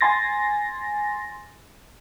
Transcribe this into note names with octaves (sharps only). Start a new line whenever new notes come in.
G#5 C6 A6 A#6